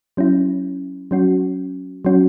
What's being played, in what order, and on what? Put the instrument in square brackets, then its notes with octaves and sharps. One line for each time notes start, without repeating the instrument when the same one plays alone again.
[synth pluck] F#3 C#4 E4
F#3 C#4 F#4
F#3 C#4 F#4